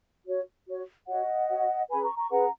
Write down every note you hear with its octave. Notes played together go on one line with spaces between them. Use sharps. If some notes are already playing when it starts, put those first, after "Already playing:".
F#4 C#5
F#4 C#5
F#4 C#5 D#5 F#5
F#4 C#5
C#4 G#4 B4 G#5 B5
A#5 C#6
A#5 C#6
C#4 G#4 B4 F#5 A#5